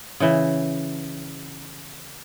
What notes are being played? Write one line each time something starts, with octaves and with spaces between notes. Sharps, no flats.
C#3 E3